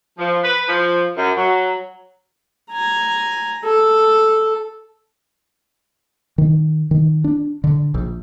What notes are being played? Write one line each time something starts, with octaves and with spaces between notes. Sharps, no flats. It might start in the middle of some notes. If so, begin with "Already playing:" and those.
F3
B4
F3
F#2
F#3
G#5 A#5
A4
D#3
D#3
D4
D3
A#1